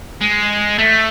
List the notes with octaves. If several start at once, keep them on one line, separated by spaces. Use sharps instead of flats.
G#3
A3